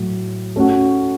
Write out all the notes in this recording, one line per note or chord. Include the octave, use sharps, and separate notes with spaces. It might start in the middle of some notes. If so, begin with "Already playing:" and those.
Already playing: A2 F#3
A3 C#4 F#4